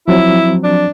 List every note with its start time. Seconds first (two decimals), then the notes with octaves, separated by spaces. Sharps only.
0.08 F3 F#3 C4 E4
0.64 D4